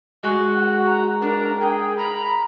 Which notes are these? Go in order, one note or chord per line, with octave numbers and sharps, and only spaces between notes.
G#3 F#4
F#5
A#5
D4 A#4 A#5
G#4 G5
A#5 B5